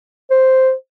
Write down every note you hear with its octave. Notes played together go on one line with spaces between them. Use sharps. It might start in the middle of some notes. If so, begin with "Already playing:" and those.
C5